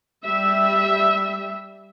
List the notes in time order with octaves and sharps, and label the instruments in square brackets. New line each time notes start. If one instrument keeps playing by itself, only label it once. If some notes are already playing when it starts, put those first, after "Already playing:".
[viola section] G3 E5